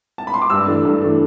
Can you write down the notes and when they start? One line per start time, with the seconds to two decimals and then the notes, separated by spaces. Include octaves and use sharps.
0.18 A5
0.27 B5
0.34 C6
0.42 D6
0.50 G2 E6
0.67 E3 A3 D4
0.85 G2
1.01 E3 A3 D4